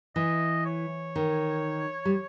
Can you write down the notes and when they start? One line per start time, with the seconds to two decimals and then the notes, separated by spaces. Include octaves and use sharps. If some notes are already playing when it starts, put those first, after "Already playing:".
0.16 E3 D#5
0.66 C#5
1.16 D#3
2.05 G3